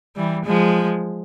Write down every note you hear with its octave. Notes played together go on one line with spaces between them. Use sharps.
E3 G3
F3 G#3